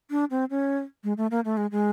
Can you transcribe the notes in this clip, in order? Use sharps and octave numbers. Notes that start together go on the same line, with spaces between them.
D4
C4
C#4
G#3
A3
A#3
A3
G#3
G#3